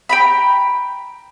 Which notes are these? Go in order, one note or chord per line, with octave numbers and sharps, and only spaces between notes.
G5 A#5 B5